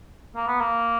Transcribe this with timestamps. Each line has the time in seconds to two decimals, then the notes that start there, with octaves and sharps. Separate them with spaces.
0.36 A#3
0.47 B3
0.60 A#3